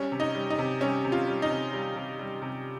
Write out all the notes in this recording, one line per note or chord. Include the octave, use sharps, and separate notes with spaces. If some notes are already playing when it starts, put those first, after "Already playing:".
Already playing: G3 C#4
C3
D#4
G3
D#4
C3
G3 C#4
C3
F4
G3
D#4
C3
G3
C3
G3
C3